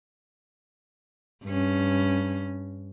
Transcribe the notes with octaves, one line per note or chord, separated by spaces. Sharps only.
G2 C#4